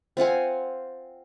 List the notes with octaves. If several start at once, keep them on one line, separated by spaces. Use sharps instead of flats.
C4 F4 F#5 G#5